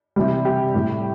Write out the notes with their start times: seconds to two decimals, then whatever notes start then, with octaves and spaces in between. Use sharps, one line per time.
0.16 C3 E3 G3
0.45 G4
0.74 A2 G3